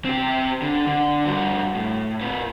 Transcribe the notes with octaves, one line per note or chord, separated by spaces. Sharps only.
C4 G4
D3
D3
G2 F#4
A2
A#2 B4